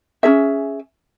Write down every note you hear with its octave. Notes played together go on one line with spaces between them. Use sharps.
C#4 D#4 G#4 E5